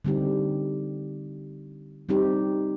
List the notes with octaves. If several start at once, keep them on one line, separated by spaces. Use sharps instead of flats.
D3 G3 C4 D#4 G4
G3 C4 D#4 G4